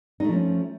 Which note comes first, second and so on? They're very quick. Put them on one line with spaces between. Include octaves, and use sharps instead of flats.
D#4 A3 F3 C#4